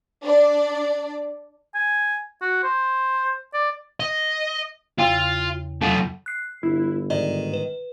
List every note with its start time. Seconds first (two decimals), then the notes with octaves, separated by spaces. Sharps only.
0.23 D4 D5
1.75 G#5
2.42 F#4
2.63 C5
3.54 D5
4.00 D#5
4.99 E2 C#3 F4
5.82 F2 F#3 A3 F4
6.26 F#6 C7
6.63 G1 E4
7.10 G#2 D#3 D5
7.54 B4